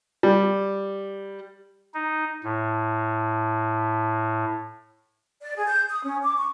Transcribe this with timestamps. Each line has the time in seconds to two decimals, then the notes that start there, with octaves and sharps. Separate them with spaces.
0.23 G3
1.94 D#4
2.44 A2
5.42 D5
5.55 G#4
5.67 G6
5.90 D#6
6.04 C#4
6.22 D6
6.36 C#6